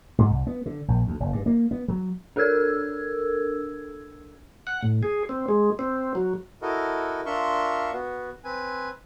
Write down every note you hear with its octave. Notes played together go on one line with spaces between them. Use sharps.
G#2
C2
B3
D3
A#1
D2
F#1
G2
A#3
B3
F#3
D4 A4 A#4 E6 G#6
F#5
A2
G#4
C4
G#3
C4
F#3
E4 F#4 A4 A#4 D#5
D4 F4 A#4 E5 C6 C#6
B3 F#4
C4 B4 G#5